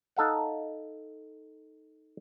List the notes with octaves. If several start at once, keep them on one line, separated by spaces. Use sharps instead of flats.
D#4 A4 F5 F#5